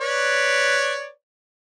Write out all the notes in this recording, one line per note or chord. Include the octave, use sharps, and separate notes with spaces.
B4 C#5 D5